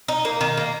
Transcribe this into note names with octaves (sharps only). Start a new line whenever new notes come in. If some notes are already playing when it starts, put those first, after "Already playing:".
D#4
A#3
D#3
A#3